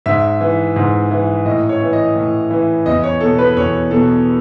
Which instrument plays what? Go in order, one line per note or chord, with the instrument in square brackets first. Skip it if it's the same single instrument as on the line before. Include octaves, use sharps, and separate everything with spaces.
[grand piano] G#2 E5
E3
G#2
E3
A2 D#5
C#5
E3
D#5
A2
E3
E2 D#5
C#5
B2 A4
B4
E2 C#5
B2 A4